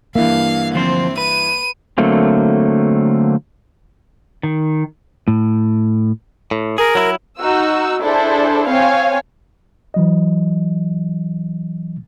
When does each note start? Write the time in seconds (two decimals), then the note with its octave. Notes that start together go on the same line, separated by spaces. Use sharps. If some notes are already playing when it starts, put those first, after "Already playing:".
0.15 G2 E3 A#3 E5 F5
0.74 D2 F3 C4 C5
1.18 B4 D#7
1.98 D3 F#3 A3 A#3 C4
4.43 D#3
5.28 A2
6.51 A2
6.78 G#4 A#4
6.95 F#3 E4
7.39 D#4 F#4 E6
8.02 D4 E4 G#4 A4 C5
8.69 C4 C#5 F5 G#5
9.94 E3 F#3 D#5